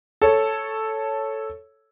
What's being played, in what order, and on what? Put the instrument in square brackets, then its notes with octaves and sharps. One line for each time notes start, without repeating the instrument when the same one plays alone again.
[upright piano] A4 C#5